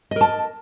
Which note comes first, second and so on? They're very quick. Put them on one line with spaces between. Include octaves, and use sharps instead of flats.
D#5 A#4 A5